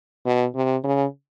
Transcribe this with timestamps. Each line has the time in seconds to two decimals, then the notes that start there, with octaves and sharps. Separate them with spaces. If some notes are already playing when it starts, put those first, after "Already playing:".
0.26 B2
0.55 C3
0.84 C#3